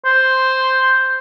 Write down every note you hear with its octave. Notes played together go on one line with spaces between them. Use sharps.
C5